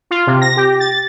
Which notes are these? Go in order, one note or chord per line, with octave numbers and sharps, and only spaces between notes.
F4
C3
A#6
G4
A6